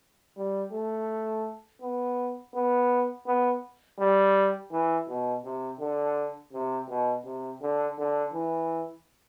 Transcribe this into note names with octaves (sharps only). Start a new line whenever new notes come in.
G3
A3
B3
B3
B3
G3
E3
B2
C3
D3
C3
B2
C3
D3
D3
E3